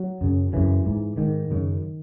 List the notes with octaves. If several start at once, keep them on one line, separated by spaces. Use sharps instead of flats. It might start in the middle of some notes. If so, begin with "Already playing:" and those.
Already playing: F#3
F#2 C#3
F#2 C#3 E3
G#2
G#2 D#3
F#2 C#3